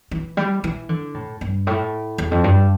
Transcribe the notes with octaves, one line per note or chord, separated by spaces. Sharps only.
E3
G3
E3
D3
A2
G2
A2
E2
F2
G2